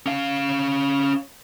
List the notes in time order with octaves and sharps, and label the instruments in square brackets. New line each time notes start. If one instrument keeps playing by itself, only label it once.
[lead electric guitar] C#4 F5